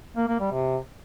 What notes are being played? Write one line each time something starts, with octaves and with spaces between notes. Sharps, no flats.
A#3
A#3
G3
C3